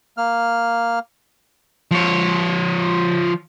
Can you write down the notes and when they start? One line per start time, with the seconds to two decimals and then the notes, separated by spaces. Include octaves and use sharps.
0.17 A#3 F6
1.91 F3 C#5